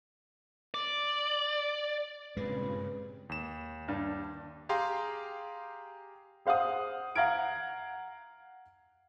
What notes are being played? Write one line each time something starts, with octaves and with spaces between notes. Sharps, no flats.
D5
G2 A#2 C#3 G#3 C4 B4
D#2 E7
G2
G4 G#4 F5 G5 A#5 C6
G#4 C5 F5 F#5 D#6
F5 F#5 A#5 F6 G#6 D7